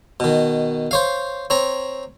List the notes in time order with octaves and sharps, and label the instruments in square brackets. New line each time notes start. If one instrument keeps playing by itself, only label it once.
[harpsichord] B2 D#3
C5 C#5 F5
C4 C#5 A#5